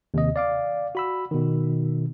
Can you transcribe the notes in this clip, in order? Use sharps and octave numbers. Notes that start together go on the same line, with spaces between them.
D#2 C3 D#5
D5 F5 D6
F#4 B5 E6
B2 D#3